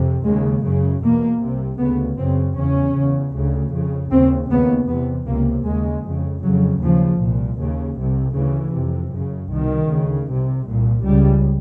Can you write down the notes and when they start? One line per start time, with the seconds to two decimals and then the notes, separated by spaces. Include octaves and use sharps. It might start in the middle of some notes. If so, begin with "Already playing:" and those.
Already playing: F2 C3
0.25 D#2 C#3 G#3
0.63 F#2 C#3
1.03 E2 B2 A#3
1.41 C2 C3
1.79 D2 C#3 B3
2.18 F#2 C#3 C4
2.57 E2 C#3 C#4
2.95 C#3
3.00 E2
3.34 D2 C#3
3.73 F2 C#3
4.11 D#2 C#3 C4
4.50 D#2 C#3 B3
4.88 E2 C3 B3
5.27 C#2 C3 A#3
5.65 D#2 C#3 G#3
6.04 F2 C#3
6.42 F2 C#3 F#3
6.81 D#2 C#3 F3
7.20 C2 A#2
7.59 D#2 C#3
7.97 C2 C3
8.35 D2 C#3 E3
8.74 F2 C3
9.12 F#2
9.17 C#3
9.51 C2 B2 D#3
9.90 D2 C#3
10.29 C2 C3
10.67 C2 A#2
11.05 C#2 C#3 G3